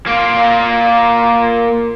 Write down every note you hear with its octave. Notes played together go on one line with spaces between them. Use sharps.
A#3 F4